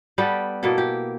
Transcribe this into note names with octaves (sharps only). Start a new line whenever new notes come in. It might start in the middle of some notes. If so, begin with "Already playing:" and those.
G3 B3 G4 A4
B2 A#3 E4 A4
G4